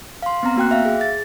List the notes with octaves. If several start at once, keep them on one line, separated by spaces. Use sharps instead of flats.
F5 C6
B3 C4 A#5
A#3 F#4 G5 F#6
E5 F5
G#4
A6